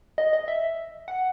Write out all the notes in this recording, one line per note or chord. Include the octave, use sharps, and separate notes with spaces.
D#5
D#5
E5
F#5